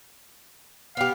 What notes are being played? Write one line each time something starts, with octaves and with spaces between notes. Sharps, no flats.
B3 G4 F5